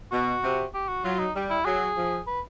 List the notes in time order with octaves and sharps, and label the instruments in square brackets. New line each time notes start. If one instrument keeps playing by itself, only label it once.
[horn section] B2 [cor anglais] F#4
[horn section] C3
[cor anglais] G4
F#4
[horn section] F#3 [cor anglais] F4
[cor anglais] D#4
[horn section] G3
[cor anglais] E4
[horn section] F#3 [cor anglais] G#4
[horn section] F3
[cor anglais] B4